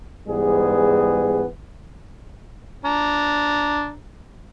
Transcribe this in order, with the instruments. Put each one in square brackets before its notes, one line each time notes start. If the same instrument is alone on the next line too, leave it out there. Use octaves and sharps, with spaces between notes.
[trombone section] G#2 E3 G3 B3 G#4
[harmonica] D4 A#5